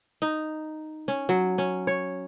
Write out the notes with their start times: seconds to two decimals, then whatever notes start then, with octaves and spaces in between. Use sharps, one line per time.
0.22 D#4
1.08 C#4
1.29 F#3
1.58 C#4
1.87 C#5